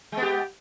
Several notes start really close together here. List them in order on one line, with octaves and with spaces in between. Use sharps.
G#3 B3 G4